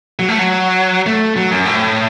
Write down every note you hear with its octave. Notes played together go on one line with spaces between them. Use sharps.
F#3
A3
F#3
A3
F#3
F#2
A2